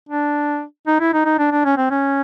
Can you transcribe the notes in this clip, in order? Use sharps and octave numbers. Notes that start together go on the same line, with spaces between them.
D4
D#4
E4
D#4
D#4
D4
D4
C#4
C4
C#4